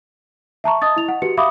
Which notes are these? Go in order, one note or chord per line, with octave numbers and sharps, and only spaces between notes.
E5 A5 A#5 C#6
D#5 A5 D#6 A6
E4 F7
F#5
F#4 G4 B4 C#7
E5 F5 B5 D6 D#6